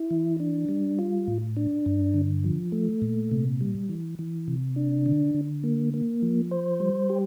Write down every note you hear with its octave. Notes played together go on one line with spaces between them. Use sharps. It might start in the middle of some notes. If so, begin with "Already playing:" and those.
Already playing: E4
E3
D4
G3
F4
A2
D4
G2
D3
F3
A3
A#2
C3
G3
E3
E3
C3
D4
D3
D3
A#3
A#3
F3
C5
G3
G4